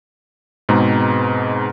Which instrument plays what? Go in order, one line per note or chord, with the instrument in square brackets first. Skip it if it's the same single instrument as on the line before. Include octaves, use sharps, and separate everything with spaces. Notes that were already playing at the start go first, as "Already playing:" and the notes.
[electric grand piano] G#2 B2 G#3 C4 B4 A#5